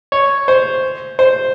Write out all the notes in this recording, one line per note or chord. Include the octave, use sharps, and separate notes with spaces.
C#5
C5
C5